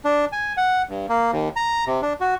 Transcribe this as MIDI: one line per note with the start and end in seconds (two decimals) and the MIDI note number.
0.05 0.25 62
0.32 0.53 80
0.57 0.82 78
0.89 1.06 43
1.09 1.31 58
1.33 1.49 39
1.56 1.85 82
1.87 2.01 48
2.02 2.13 62
2.21 2.34 66